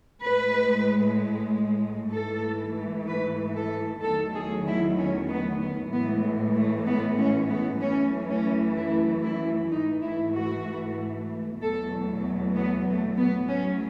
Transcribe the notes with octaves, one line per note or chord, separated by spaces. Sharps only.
A2 G#3 B4
G#2 E3 A3 A4
B4
A4
E2 D#3 F#3 A3 A4
G#4
E4
C#4
B3
B3
A2 E3 G#3 B3
A3
B3
C#4
B3
F#2 E3 A3 C#4
C#4
E4
E4
G#2 E3 A3 D#4
E4
F#4
E2 B2 F#3 A3 A4
B3
A3
B3
A2 F#3 A3 C#4